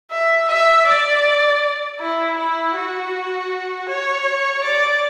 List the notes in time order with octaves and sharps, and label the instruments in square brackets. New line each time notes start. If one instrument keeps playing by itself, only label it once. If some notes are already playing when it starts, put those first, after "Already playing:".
[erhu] E5
E5
D5
E4
E4
F#4
C#5
D5